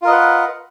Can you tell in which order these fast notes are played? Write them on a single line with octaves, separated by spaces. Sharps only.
F4 A#4 D#5 B4 F#5